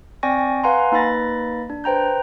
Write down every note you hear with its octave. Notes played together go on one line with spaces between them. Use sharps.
C4 D5 G5 G#5 C#6 A#6
B4 F5 F#5 G#5 A#5 C6
A#3 D#4 B4 B5 A6 A#6
D4
B4 C5 G5 A#5 G6